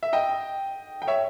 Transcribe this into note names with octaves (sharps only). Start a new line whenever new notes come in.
E5
D#5 G5
G5
C#5 E5